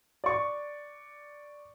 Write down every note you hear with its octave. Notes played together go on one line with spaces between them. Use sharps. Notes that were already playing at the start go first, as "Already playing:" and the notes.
D5 C#6